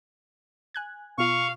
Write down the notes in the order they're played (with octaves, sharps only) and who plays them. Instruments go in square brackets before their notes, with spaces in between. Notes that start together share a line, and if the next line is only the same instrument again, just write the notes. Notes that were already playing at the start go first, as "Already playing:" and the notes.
[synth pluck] G#5 F#6 G#6
[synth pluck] B2 F4 [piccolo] F5 [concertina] C#6